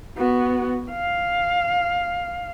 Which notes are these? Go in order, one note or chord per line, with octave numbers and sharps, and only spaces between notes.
B3 F#4
F5